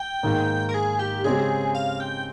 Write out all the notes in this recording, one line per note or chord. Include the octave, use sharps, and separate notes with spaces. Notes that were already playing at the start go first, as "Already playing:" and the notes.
Already playing: G5
G#2 D#3 A#3
A#4
G#4
G4
C#3 G#3 C4 G4 G#4
F5
G5